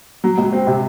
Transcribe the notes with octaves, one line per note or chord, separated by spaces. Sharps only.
F#3
C#2
C4
C3